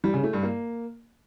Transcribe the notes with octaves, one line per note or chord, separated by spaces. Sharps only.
G3
C#3
A3
G2
A#3